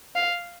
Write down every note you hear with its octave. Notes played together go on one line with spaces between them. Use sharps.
F5